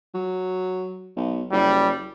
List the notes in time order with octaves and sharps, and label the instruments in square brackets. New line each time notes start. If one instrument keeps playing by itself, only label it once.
[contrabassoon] F#3
B1
[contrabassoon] F#1 [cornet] G3